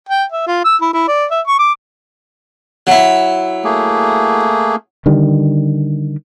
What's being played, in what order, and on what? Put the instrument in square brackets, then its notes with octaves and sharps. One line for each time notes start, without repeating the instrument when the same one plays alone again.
[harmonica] G5
E5
F4
E6
E4
E4
D5
E5
C#6
D6
[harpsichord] F#3 E4
[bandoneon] A3 A#3 G#4
[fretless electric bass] D3 D#3 G3